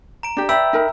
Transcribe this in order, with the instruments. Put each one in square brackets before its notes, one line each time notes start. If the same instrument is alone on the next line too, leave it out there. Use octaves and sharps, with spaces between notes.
[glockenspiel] A#5 D7
[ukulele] D4 G4
[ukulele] B4 D5 [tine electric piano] E5 G5 B5 [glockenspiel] E6
[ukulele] D#4 A#4 A#5